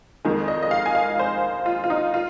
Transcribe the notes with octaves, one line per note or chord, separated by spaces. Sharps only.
F2 D#3 G#3
D#5
D#5
F5
G#5
F5
C5
F4
F4
D#4
F4